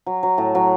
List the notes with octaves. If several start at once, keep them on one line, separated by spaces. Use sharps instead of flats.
F#3
F#3
A2
F#3